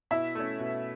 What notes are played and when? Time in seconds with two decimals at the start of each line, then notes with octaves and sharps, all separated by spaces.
0.11 B2 E4 E5
0.35 A3 C#4
0.59 B2